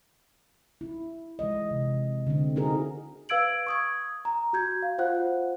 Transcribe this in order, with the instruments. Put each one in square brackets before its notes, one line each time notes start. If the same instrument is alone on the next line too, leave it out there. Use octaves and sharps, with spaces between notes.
[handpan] E4
E3 G#3 D#5
C3
D3 C4
D#4 E4 F#4 G#4 A#4
[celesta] B4 F5 E6 G#6 D7 F#7
C#6 D#6 G#6
A#5
F#4 G6 G#6
F5
F4 C5 F5 F#5 F#6